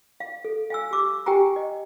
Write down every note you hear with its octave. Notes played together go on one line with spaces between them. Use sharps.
F5
A4
F5 G#5 E6
G4 D6 E6
G4 G5 G#5 A#5
D#5